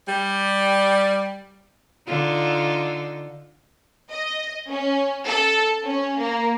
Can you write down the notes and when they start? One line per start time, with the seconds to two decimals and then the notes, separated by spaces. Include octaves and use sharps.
0.08 G3
2.07 D3 D#4 F4
4.11 D#5
4.70 C#4
5.26 A4
5.84 C#4
6.18 A#3